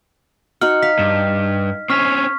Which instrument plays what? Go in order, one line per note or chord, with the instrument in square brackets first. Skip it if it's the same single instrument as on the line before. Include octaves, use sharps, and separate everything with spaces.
[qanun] D#4 F#4 F#5 [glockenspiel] F6
[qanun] F5 [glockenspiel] B6
[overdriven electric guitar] G2
[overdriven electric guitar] C4 C#4 [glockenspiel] C#6 F6 B6